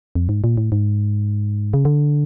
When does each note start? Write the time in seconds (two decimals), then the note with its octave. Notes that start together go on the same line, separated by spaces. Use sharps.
0.15 F2
0.29 G#2
0.44 A#2
0.57 A2
0.72 G#2
1.74 C#3
1.85 D3